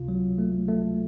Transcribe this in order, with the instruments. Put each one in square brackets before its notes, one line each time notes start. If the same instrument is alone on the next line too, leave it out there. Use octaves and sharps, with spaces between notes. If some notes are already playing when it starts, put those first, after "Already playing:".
Already playing: [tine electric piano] C#2 C3 F4
F#3
A3
A3